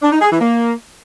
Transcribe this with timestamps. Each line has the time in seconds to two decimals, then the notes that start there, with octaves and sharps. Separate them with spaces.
0.02 D4
0.12 D#4
0.22 G#4
0.31 E3
0.41 A#3